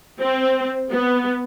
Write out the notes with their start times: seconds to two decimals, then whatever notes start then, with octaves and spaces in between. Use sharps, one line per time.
0.20 C4
0.92 B3